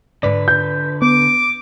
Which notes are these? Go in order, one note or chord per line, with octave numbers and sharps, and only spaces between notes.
G#2 D3 B4 D5
G6
B3 D6